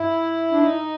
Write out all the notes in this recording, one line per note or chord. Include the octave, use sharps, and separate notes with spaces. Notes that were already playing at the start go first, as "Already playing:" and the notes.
Already playing: G2 E4
D4
D#4